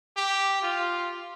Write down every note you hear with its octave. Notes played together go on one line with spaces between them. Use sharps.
G4
F4